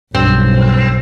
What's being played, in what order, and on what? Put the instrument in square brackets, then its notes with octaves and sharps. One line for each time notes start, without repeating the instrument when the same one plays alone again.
[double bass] B1 [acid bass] G2 [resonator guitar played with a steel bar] C4